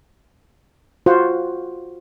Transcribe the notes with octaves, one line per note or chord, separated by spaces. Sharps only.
F4 F#4 C5 F#5